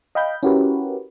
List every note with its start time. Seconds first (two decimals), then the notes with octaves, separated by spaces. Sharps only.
0.15 D#5 F5 G5 B5 G6
0.43 C#4 E4 F#4 G4 A#4 B4